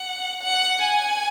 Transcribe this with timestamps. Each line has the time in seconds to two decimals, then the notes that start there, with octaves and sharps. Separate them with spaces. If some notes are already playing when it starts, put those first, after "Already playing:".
Already playing: F#5
0.42 F#5
0.83 G#5